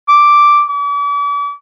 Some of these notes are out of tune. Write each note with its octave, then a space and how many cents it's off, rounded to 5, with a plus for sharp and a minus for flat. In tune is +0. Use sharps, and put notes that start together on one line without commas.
D6 +0
D6 -40